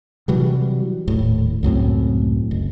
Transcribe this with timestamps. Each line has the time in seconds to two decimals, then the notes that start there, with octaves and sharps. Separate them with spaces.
0.28 C3 E3 F#3 G3
1.07 D#1 A2
1.63 C#2 F#2 A2 C4
2.51 F#1